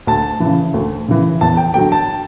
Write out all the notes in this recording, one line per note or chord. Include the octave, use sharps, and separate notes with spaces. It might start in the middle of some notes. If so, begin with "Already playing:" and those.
D2 A5
C#3 E3
D2
C#3 E3
E2 A5
G5
D3 F#3 G5
A5